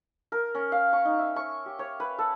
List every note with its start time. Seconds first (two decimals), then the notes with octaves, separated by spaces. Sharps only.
0.32 A#4
0.55 C#4
0.72 F5
0.93 C#6
1.05 D#4
1.19 E5
1.36 C#6
1.66 G4
1.79 C#5
2.00 B4
2.19 A4